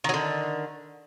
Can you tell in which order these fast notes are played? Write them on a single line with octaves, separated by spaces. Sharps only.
D#3 F#3 D3